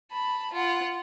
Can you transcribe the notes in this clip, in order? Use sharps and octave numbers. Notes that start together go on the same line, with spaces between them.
A5 B5
F4 F#5